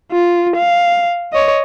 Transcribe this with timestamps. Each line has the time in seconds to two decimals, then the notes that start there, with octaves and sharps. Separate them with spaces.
0.12 F4
0.56 F5
1.33 C#5 D#5